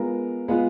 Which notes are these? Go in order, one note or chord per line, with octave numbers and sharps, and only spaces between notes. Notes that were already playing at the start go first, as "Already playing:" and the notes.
Already playing: G#3 B3 F4 A#4
G#3 B3 F4 B4